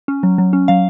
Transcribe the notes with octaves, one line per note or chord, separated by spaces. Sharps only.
C#4
F#3
F#3
C#4
F#3 F5